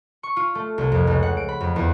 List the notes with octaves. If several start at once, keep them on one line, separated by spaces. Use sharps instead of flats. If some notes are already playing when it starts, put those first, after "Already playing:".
C#6
F4
A3
C2
F2
C#2
F#5
D7
B5
F2
E2